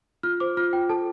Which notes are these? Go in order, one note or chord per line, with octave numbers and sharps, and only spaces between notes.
F4 F6
C5 D6
F4 F6
F4 G5
A4 A5